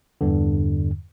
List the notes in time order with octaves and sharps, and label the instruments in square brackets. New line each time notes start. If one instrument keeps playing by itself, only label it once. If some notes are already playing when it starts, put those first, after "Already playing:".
[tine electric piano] E2 G2 D3